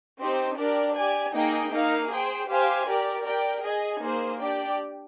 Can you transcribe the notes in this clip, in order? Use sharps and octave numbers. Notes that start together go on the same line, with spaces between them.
C4 D#4 G4 C5
D4 G4 A#4 D5
G4 D5 G#5
A#3 D#4 G#4 D#5 G5
A#3 D#4 A#4 F5
G#4 C5 G5
G4 C5 F5 G#5
G4 A#4 D5
G4 A#4 D5 G5
G#4 D#5 G#5
A#3 D#4 G#4 C5
D4 G4 D5 G5